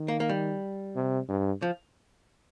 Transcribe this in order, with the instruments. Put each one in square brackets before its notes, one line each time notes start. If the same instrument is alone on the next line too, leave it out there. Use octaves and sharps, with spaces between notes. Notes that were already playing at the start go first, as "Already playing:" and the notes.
Already playing: [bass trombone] D#3
[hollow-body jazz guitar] A#3
A#3
G3
[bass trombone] C3
G2
[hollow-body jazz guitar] F3